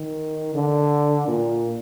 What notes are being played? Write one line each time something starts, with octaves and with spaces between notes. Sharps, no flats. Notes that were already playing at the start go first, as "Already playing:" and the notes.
Already playing: D#3
D3
A#2